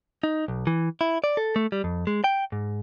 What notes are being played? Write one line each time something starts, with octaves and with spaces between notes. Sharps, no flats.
D#4
B1
E3
E4
D5
A4
A3
G3
F2
G#3
G5
G#2